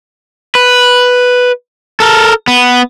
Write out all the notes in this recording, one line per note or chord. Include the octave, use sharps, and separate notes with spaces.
B4
A4 A#4
B3